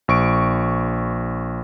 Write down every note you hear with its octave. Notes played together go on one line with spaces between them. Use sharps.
A#1 C#6 D7